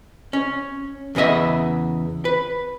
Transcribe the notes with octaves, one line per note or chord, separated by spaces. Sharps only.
C#4
E2 C#3 B3 D#5 E5
B4